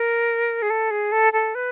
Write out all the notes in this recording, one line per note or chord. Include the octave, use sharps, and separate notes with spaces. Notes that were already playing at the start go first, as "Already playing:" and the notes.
Already playing: A#4
G#4
A4
G#4
A4
A4
B4